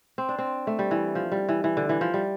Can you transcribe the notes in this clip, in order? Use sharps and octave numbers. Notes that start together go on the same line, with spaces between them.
C4
D4
C4
A3
G3
E3
F3
G3
E3
E3
D3
E3
F3
G3